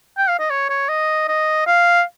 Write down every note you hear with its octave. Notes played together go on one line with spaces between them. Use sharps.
G5
F5
D#5
C#5
C#5
D#5
D#5
F5